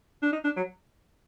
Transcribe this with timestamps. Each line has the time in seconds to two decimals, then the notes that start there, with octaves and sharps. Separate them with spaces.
0.23 D4
0.33 D#4
0.44 D4
0.57 F#3